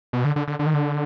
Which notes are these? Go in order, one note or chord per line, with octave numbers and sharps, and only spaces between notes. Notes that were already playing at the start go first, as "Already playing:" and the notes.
B2
D3
D3
D3
D3
D#3
D3